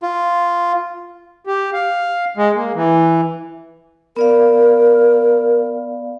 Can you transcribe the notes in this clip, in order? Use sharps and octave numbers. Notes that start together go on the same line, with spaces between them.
F4
G4
F5
G#3
A#3
E3
B3 A#4 D5 F5